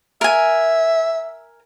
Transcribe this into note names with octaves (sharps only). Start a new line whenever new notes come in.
A#4 E5 G#5